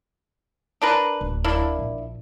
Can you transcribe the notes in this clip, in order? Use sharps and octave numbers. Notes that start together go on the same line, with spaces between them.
D4 A#4 B4
D1
A#3 D4 E4
A#1